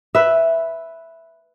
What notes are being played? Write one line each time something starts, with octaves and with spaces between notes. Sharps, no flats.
B4 E5